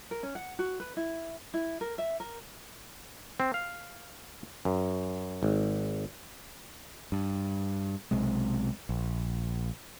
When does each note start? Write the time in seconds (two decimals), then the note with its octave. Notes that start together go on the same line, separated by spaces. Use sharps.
0.11 A#4
0.23 C#4
0.35 F#5
0.59 F#4
0.80 B4
0.97 E4
1.54 E4
1.81 A#4
1.98 E5
2.20 A#4
3.40 C4
3.54 F5
4.65 F#2
5.43 G#1
7.12 G2
8.11 B1 C3 G#3
8.89 A#1